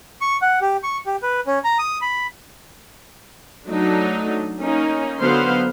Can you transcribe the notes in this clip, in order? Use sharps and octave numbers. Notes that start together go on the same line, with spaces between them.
C#6
F#5
G4
C#6
G4
B4
C#4
A#5
D#6
B5
F#3 A3 D4 D#4
A#3 C#4 D#4
D3 F#3 B3 C5 F5 C6